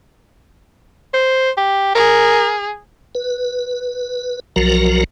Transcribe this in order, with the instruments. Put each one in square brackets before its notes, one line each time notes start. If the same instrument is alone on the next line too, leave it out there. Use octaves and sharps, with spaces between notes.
[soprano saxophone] C5
G4
[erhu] G#4 [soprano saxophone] A#4
[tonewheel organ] B4
B1 F3 F#3 F#4 A#4 A#5